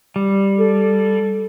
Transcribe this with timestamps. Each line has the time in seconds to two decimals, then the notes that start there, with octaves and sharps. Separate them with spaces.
0.16 G3
0.59 A4